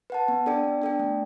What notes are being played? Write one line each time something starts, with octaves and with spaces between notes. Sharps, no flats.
B4 F#5 A5
B3
D4 A4 D5 G5
B3
D4 A4 D5 G5
A3